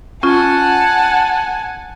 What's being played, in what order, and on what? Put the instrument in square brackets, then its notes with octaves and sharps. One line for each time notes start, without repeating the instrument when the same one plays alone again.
[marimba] C#4 F4 [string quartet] F#5 G#5 A5